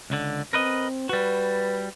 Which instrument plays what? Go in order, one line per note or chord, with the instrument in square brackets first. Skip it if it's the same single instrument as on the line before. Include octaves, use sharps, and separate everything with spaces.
[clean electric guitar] C#2 D3
[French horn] C4 [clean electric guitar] A#4 B4 D#5
[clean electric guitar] G3 F#4 [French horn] B4